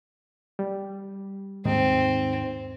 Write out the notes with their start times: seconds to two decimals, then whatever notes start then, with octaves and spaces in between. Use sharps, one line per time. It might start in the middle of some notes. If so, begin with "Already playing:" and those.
0.59 G3
1.65 D#2 G#2 C4 D#4